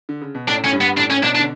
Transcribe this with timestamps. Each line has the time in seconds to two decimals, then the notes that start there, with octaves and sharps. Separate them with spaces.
0.09 D3
0.21 C#3
0.35 B2
0.48 A2 D4
0.64 A2 C#4
0.72 G2
0.81 B3
0.97 A2 D4
1.10 C#4
1.23 B2 D4
1.35 D4
1.39 D3